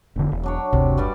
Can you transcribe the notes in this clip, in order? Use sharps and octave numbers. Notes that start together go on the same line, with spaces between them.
F1 A2 D3
E1
F#3 D4 C#5
F#1 D2 C3
G2 G3 D5